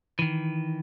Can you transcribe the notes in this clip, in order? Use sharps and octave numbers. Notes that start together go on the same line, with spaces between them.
D#3 E3